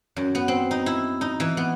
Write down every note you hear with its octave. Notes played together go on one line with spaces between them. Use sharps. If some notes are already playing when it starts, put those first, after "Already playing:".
F#2
B3
C4
D#4
E4
D#4
E3
B3